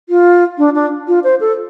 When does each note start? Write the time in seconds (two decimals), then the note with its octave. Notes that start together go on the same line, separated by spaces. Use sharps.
0.09 F4
0.58 D4
0.75 D4
1.08 F4
1.24 C5
1.41 A4